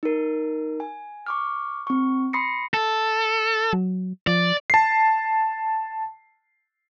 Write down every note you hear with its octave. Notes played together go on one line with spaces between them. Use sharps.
D#4 A#4
G#5
C#6 D6 F6
C4 C#6
B5 C6 D#6 A#6 C7 C#7
A4
F#3
F3 D5
A5 C7